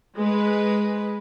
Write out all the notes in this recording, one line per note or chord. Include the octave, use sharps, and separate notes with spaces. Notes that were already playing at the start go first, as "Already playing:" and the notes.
G#3 B4